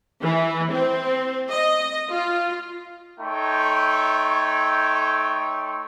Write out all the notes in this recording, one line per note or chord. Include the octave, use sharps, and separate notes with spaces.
E3
C4
D#5
F4
A3 D#4 A4 C#5 G5 C6